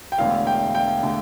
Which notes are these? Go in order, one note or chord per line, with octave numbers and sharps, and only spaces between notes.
G5
E1 E2 D3 A3 F5
G5
G5
D3 A3